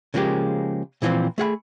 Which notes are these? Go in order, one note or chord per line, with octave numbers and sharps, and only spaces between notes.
C#3 F3 G#3 A#3 G4
A#2 E3 F3 A#3 C4
A3 G#4 F#5 B5